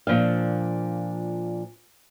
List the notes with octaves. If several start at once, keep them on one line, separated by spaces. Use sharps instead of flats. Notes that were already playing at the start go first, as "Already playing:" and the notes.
A#2 F3 D4 F5